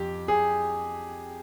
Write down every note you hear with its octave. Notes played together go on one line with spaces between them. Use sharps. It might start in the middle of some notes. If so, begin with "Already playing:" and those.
Already playing: F2 G4
G#4